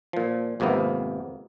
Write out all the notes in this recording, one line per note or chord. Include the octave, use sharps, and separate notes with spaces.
A#2 F3
G#1 F2 C3 A#3 B3